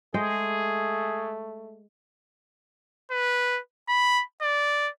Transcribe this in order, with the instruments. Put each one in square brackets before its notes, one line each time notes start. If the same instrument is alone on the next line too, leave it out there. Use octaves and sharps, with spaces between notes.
[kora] G#3 D#5 G5 [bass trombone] A3 [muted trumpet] G#4
[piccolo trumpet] B4
B5
D5